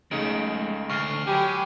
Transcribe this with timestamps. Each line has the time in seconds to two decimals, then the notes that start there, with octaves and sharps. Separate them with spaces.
0.11 C#2 C#3 G#3 A3 D#4 D7
0.90 D2 C#6 F6 C7
1.27 F#3 G#3 G4 G#5 B5 D#7